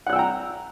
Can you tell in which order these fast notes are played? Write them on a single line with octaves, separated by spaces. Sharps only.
F#5 F#6 E6 G5 A#5